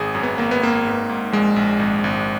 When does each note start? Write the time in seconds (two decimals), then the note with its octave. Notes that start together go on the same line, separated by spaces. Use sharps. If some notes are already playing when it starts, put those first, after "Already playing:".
Already playing: G#1 G#4
0.15 F#2
0.23 B3
0.38 G#1 A#3
0.51 B3
0.63 G#1 A#3
0.86 G#2
1.09 G#2
1.32 A#1 G#3
1.56 A#1
1.79 G#1
2.04 G#1